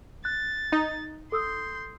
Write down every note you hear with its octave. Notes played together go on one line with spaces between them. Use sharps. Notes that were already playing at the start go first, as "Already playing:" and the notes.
F#6 A6
D#4
A4 C6 D#6 E6 G6